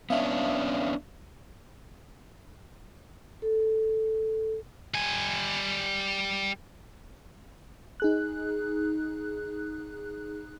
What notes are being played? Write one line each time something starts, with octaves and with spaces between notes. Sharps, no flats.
B3 C#4 D4 E5 F5
A4
G3 G#5
D#4 G#4 F#6